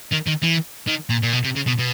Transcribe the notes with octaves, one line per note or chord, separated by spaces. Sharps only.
D#3
D#3
E3
D#3
A#2
A#2
B2
C3
C#3
B2
B2